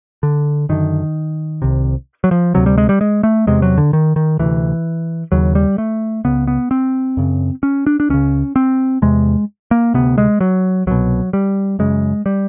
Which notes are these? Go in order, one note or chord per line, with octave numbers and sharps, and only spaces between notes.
D3
F#2 D3 D#3
C2 C3
F#3
F3
D2 C3 F#3
G3
G#3
G3
G#3
A3
E2 C3 G#3
F#3
D3
D#3
D#3
D2 C3 E3
D#2 C#3 F#3
G3
A3
C#2 C#3 B3
B3
C4
F#2 C#3
C#4
D4
D4
C#2 C#3 C#4
C4
E2 C3 G#3
A#3
D2 C3 B3
G#3
F#3
C2 B2 F#3
G3
F#2 C#3 G#3
G3